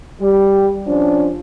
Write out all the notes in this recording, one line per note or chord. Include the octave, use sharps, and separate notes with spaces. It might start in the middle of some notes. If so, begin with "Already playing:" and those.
G3
F3 C#4 D4